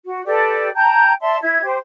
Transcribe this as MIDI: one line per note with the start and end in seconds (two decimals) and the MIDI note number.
0.05 0.24 66
0.26 0.69 67
0.26 0.69 69
0.26 0.69 71
0.26 0.69 74
0.75 1.13 79
0.75 1.13 81
0.75 1.13 82
0.75 1.13 91
1.21 1.38 74
1.21 1.38 76
1.21 1.38 81
1.21 1.38 84
1.42 1.62 64
1.42 1.62 76
1.42 1.62 92
1.63 1.77 67
1.63 1.77 72